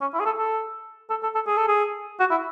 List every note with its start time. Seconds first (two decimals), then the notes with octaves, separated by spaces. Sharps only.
0.01 C#4
0.14 E4
0.20 G#4
0.25 A4
0.38 A4
1.10 A4
1.23 A4
1.35 A4
1.47 G#4
1.57 A4
1.68 G#4
2.20 F#4
2.31 E4